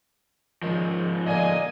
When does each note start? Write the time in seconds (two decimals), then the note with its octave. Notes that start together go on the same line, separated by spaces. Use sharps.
0.63 G#2 D#3 F3
1.26 A#2 D3 A#3 G#4 D#5 G#5